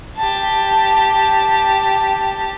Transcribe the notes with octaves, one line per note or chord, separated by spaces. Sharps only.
G4 A5